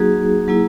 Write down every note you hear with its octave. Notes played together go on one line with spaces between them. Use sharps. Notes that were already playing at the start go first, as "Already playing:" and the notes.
Already playing: F#3 A#3 D#4 F#4 G#4
F#3 A#3 E4